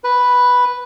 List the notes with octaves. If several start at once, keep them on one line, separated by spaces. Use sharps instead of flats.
B4